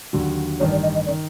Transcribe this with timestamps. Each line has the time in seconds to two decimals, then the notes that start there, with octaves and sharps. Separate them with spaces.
0.13 D#2 D3 F#3
0.60 A1 G2 D#3 C#5
0.71 D5
0.83 D#5
0.95 D#5
1.06 D#3 D5